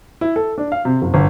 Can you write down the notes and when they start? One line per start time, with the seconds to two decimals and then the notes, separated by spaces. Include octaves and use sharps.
0.21 E4
0.36 A4
0.58 D4
0.72 F5
0.85 C3
1.02 F#1
1.14 G1